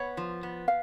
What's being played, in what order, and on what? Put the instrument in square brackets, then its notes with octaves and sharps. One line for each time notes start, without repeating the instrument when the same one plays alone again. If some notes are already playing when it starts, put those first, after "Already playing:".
Already playing: [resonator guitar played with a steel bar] B3 [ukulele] C#5
[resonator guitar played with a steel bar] F3
B3
[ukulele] F5